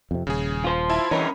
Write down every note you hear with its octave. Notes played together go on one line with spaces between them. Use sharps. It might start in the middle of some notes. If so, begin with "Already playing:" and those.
F2 C3
D#1 C#3 G#4
F4 C5
E4 E5 A5
G2 C#3 E3 A#4 C#5 D#5 B5